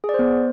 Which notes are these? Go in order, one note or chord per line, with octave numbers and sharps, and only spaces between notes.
G#4
D5
C5
B3